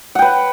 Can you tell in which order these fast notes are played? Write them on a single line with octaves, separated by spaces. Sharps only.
F#5 G5 B4